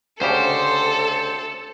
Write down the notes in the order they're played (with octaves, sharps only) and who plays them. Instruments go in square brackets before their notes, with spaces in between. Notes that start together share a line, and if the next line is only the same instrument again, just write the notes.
[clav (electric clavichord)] D2 C#3 G4 [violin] A4 [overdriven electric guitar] C5